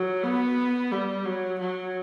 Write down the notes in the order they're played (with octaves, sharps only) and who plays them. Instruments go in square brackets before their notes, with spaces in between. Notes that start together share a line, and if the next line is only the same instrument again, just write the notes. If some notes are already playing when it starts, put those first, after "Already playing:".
Already playing: [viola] F#3
B3
G3
F#3
F#3